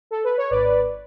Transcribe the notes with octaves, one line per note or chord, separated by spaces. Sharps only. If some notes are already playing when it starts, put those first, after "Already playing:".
A4
B4
C#5
G#1 B4 D5